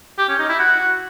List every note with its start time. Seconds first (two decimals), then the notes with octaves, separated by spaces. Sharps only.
0.18 G4
0.29 C#4
0.39 D#4
0.49 E4
0.59 F#4